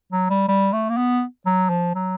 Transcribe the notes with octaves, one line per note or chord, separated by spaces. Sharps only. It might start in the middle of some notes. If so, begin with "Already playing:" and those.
F#3
G3
G3
A3
A#3
B3
F#3
F3
F#3